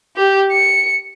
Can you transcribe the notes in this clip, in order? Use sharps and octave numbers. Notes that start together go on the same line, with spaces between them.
G4
C#7